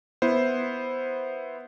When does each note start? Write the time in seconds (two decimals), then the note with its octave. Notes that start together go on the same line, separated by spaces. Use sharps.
0.22 B3 E4 C5